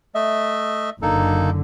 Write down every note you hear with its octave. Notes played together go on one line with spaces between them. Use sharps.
A3 D#5 E5
F#1 D3 A#3 D#4 A4